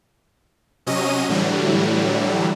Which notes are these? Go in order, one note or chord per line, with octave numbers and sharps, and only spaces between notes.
C3 F#3 C#4 D#5 D#7
A2 D3 E3 F#3 G3